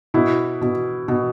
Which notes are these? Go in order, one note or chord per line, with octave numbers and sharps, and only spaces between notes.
B2 E4
B2
B2